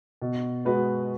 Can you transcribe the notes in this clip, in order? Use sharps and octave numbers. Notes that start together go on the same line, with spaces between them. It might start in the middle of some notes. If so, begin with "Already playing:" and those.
B2
G#3 B3 F#4 B4